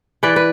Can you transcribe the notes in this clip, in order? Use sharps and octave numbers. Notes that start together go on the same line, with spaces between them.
E3 B4 D5
B4